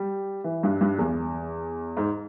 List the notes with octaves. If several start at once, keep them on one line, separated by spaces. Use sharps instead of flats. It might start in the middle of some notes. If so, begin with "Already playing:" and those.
Already playing: G3
E3
G2
G2
E2
G#2